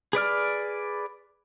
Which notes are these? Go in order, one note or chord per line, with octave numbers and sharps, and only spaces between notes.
G#4 B4 D5 F6